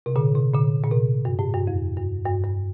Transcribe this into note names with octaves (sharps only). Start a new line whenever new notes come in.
C3
A#2 D3
C3
A#2 D3
A#2
C3
G2
A2
G2
F2
G2
G2
G2